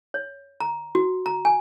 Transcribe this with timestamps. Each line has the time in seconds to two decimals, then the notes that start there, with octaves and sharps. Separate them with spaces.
0.14 C#5
0.60 A#5
0.95 F#4
1.26 A#5
1.45 G#5